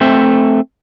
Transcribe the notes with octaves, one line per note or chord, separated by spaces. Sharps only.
A3 C4 C5 E5